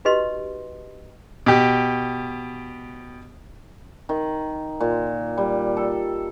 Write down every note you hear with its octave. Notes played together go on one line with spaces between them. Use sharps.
D#4 F#4 G4 B4 D#5 C6
B2 G4
D#3
A#2
G3
A4